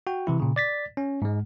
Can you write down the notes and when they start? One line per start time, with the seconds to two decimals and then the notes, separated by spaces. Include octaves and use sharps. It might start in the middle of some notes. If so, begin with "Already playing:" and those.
0.07 F#4 G5
0.27 C3 E3 E4
0.40 A#2 C#3
0.56 D5 A6 B6
0.97 C#4
1.22 G#2 G#3